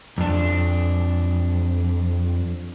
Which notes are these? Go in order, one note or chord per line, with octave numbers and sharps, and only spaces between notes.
F2 D4